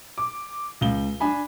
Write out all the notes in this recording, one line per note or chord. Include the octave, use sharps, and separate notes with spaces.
D6
C#2 G7
D4 G#5 B5